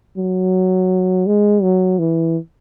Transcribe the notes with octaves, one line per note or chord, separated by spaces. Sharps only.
F#3
G#3
F#3
E3